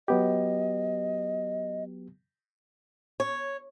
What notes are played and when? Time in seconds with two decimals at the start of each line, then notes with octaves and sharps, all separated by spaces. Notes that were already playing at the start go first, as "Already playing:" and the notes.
0.08 F#3 B3 G4 D#5
3.20 C#5